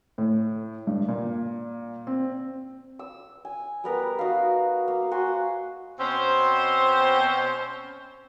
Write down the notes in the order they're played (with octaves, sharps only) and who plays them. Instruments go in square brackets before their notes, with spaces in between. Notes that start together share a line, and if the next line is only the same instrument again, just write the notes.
[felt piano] A2
G2
A#2
C4
[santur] E6
G#5
G3 B3 A#4
D#4 F#4 F5
A#3
F#4 C5 G#5
[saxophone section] B2 C4 C#4 C5